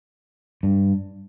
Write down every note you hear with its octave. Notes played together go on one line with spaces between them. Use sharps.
G2